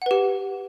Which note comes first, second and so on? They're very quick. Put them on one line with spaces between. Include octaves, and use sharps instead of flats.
F#5 B4 G4